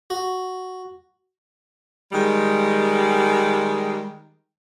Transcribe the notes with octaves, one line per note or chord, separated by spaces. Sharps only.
F#4
D#3 G3 G#3